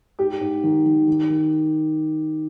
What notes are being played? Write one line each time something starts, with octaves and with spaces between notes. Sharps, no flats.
G#2 G4
G#2
D#3
D#3
D#3
D#3